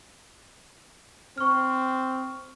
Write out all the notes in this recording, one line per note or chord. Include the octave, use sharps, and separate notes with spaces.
C4 C#6 F6